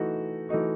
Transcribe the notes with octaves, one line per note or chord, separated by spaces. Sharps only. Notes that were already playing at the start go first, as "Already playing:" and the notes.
Already playing: E3 A3 D#4 F#4
E3 A3 D#4 F#4